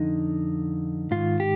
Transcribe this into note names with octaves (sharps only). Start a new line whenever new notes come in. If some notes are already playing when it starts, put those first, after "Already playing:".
Already playing: F2 D3 D#4
G#2 D#3 F4
G4